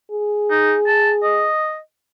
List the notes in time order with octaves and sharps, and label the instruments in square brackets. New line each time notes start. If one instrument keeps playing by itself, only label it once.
[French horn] G#4
[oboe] D#4
A5
D#5